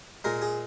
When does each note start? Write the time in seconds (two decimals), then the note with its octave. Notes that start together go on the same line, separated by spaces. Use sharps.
0.24 A#2 G#3 A#4
0.42 G#4